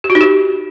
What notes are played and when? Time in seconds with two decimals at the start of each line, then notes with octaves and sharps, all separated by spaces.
0.04 G4
0.10 F#4
0.15 D#4
0.21 G4